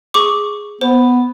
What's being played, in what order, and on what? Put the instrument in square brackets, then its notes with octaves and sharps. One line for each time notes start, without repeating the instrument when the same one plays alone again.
[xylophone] G#4 C#6 D6
[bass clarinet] B3 [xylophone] C5